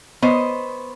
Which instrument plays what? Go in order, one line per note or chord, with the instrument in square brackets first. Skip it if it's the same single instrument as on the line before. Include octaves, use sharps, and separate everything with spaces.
[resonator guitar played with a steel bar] B3 C5 C#5 D#5